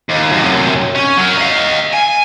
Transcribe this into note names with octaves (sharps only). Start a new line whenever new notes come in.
D#2
F#2 C3
C#4
F#3 A#4
D#5 F5
G#5